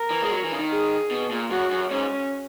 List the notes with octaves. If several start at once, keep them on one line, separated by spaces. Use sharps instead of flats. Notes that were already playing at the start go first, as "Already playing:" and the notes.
Already playing: A#4
E3
G#3
F#3
E3
C#3
D#3
G#4
B2
A#2
F#2 F#4
F#2
G#2 C#4